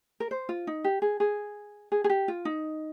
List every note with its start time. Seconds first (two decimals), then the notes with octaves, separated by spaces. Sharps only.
0.20 A#4
0.31 C5
0.49 F4
0.67 D#4
0.84 G4
1.02 G#4
1.20 G#4
1.92 G#4
2.04 G#4
2.09 G4
2.28 F4
2.45 D#4